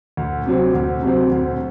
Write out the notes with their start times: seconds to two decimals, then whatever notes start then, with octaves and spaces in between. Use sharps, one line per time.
0.17 D2
0.46 C3 F#3 C4
0.74 D2
1.03 C3 F#3 C4
1.32 D2